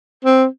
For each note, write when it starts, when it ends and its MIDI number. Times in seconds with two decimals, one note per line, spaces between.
0.25 0.46 60